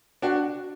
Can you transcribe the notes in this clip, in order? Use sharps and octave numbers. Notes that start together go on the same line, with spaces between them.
D4 F#4